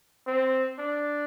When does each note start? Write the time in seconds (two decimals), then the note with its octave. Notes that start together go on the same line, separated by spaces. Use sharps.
0.27 C4
0.79 D4